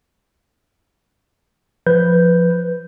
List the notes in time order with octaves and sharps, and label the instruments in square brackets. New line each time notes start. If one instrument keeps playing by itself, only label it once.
[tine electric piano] F3 B4 G6